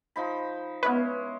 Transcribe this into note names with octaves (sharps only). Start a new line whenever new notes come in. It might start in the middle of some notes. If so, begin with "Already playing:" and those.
F3 D#4 B5
G#3 B3 C#4 E4 B4